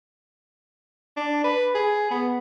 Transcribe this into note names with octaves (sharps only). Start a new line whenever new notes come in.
D4
B4
G#4
B3